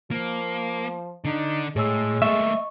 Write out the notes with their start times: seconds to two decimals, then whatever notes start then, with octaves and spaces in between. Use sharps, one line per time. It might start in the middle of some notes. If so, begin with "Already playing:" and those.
0.11 F3 A#3
1.25 D3 D4 D#4
1.76 A2 G#3 G#4 C#5 E6
2.22 A3 A#3 D#5 E5 C#6